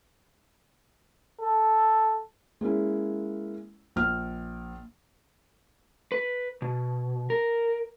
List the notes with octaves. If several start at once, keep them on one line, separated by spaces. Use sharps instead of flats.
A4
G#3 A#3 C#4 E4
A#1 F6
B4
B2
A#4